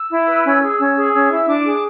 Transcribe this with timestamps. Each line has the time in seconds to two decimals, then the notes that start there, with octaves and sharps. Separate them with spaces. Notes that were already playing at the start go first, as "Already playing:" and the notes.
Already playing: E6
0.11 E4
0.27 B4
0.44 C#4
0.62 G#4
0.79 C#4 E6
0.96 G#4
1.13 C#4 E6
1.30 E4
1.47 D4 D6
1.65 G#4